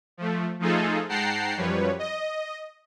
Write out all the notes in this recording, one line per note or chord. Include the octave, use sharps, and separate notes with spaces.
F3 A3
F3 A3 D#4 F4 G#4 A4
G#2 F#5 G5 A5 A#5 C7
F#2 F3 G3 B4 C#5
D#5